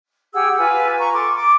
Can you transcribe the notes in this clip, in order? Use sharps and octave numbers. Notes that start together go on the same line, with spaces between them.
G4 G#4 F#5 E6
F4 B4 G#5
A#5 C#6
A4 C6 D6
C6 D6